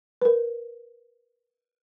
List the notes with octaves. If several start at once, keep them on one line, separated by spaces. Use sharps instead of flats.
A#4 B4